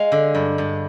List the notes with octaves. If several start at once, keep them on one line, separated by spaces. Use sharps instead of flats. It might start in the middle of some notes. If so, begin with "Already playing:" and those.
Already playing: G#3 F5
D3
G2
G2